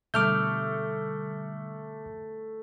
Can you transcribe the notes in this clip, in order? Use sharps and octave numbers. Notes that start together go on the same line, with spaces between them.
B2 D3 G3 A3 D6 F6 G6